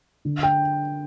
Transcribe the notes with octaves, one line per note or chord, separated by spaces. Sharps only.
D3
G5